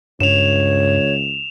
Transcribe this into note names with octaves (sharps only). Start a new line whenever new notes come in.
C#2 G2 C#5 E7 F7